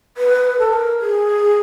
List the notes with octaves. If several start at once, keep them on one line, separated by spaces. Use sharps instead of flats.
B4
A4
A#4
G#4